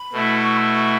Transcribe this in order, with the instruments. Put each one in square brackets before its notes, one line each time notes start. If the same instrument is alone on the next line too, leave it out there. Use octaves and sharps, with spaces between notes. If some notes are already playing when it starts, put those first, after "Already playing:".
Already playing: [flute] B5
[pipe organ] B2 A3 E4
[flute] C#6
B5
C#6